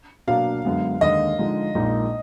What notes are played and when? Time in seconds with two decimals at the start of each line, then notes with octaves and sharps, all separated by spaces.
0.27 B2 F#3 A#3 D4 F5
0.65 F#2 D3 G#3 B3
1.01 D#2 D3 G#3 D#5
1.38 D3 F3 G#3 D#4
1.75 A#1 A#2 G#3 D#4